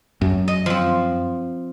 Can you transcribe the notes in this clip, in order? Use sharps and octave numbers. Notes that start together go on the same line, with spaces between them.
F#2
D#5
F3 C4